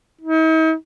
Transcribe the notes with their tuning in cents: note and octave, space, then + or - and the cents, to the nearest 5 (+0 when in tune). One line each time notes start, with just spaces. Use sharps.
D#4 +45